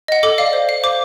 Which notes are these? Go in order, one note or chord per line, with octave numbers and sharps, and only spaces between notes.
D#5 F#5
A4 D6
D5 F5
C5
F5
C5 D6